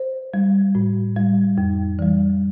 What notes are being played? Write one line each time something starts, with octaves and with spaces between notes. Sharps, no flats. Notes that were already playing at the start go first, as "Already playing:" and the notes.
Already playing: C5
G3
A2
G3
F2
E3 G3